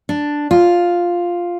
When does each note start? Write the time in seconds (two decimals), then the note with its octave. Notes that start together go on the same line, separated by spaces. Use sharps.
0.09 D4
0.51 F4